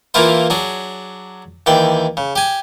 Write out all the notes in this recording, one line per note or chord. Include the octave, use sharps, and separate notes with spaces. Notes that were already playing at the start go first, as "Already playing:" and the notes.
E3 A#3 E4 F4 C5
F#3 D4 G#4
D#2 E3 D5 G5
C#3
G4 G#5